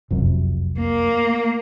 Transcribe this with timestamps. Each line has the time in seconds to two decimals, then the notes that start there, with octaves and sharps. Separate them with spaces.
0.11 F1 C2 F#2
0.80 A#3